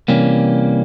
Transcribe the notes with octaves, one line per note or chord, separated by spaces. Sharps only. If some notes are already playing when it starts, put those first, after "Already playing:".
C3 E3 G3 A#3 C#4